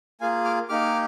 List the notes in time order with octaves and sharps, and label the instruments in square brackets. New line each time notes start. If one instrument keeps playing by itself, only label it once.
[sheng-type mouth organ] A#3 F4 G#4 F5 G#5
D6 F6
A#3 D#4 G4 D6 F6